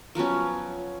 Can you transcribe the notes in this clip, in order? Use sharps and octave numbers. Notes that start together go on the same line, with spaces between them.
F3 F#3 B3 C#4